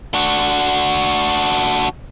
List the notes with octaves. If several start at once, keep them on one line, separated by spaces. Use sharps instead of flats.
D4 F#4